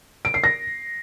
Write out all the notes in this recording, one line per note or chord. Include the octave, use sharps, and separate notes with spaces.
D7
C7
A#6